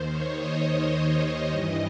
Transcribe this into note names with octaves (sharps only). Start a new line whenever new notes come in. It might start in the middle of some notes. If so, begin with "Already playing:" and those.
Already playing: D#2 D#3 C5
C#5
D#5
G2 E3